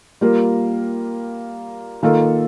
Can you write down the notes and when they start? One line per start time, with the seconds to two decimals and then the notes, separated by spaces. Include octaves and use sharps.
0.21 G3 A#3 F4 A#4
2.03 D#3 A#3 F4 A4